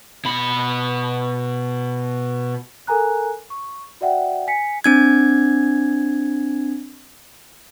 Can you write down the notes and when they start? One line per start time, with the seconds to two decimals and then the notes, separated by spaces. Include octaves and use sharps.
0.25 B2 B5
2.87 A4 A#4 G#5 A#5 F#6
3.50 C#6
4.01 F#4 D5 E5 F#5 G5
4.47 G#5 B6 C#7
4.84 C4 D4 G#6